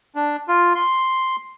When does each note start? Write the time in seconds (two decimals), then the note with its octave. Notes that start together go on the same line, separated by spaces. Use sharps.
0.16 D4
0.48 F4
0.75 C6